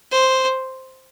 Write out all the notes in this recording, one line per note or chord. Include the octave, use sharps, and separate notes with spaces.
C5